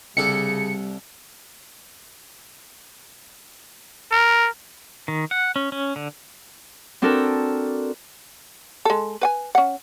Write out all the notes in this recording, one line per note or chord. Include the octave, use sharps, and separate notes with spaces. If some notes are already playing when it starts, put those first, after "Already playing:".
C2 C#3 G3 D4 A4 C#7
A#4
D#3
F#5
C#4
C#4
D3
C4 D4 F#4 A4 A#4
G#3 A4
B4 F#5 G#5
C#4 F#5